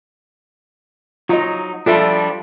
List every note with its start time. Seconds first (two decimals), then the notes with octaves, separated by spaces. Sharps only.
1.29 F#3 D#4 F4 D#5
1.86 F3 G3 D4 F4 A4 E5